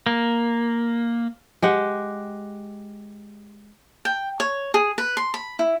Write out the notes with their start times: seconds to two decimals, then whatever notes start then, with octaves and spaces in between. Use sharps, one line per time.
0.06 A#3
1.62 G#3 G4 F#5
4.05 G5
4.40 C#5
4.74 G#4
4.98 B4
5.17 C6
5.34 B5
5.59 E4